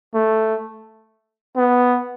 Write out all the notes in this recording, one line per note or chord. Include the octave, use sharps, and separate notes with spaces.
A3
B3